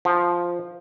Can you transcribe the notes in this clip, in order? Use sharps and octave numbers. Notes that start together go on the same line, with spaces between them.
F3